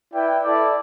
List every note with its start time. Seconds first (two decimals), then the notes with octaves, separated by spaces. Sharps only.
0.12 E4 B4 D5 G5
0.44 E4 A4 D5